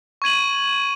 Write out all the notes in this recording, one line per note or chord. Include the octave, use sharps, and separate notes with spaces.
C#6 G#6 D#7 F#7